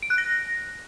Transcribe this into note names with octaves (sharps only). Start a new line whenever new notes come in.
D7
F#6
A#6